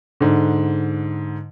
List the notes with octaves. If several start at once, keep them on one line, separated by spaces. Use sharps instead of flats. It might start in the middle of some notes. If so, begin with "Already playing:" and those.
G#2 D3